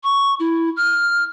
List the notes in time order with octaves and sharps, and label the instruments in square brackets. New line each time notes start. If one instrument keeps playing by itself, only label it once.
[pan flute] C#6
E4
F6